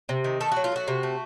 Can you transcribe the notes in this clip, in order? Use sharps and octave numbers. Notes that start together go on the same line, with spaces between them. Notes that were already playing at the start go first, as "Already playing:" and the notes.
C3
D#3
A3 A4
F#3 F#4
F4
A3 F#4
C3
A3